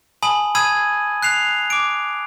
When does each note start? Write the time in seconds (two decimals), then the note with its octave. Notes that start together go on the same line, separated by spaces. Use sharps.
0.23 G#5 A5 B5 D#6 F#7
0.55 A5 B5 D#6 E6 G#6 D#7
1.23 F#6 C7 F7
1.70 D6 D7